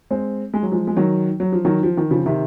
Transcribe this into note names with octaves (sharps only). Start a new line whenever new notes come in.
G#3 C4
G#3
F#3
F3 G#3
G#3
D#3 F#3
F#3
F3
D#3 F#3
F3
D#3
C#3 F3
C3 D#3